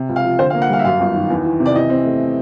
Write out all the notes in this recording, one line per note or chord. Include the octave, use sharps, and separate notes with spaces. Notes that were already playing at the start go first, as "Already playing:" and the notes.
Already playing: C3
C#2
F5
F3
D3 C5
F5
A#3
F#5
G3 F5
E5
F#2 F5
G1
D#3
E2
E3
C3
D5
E3 D#5
C4
A3